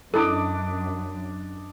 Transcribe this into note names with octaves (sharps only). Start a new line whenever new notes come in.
F#2 D4 E4 A4 D#5 D6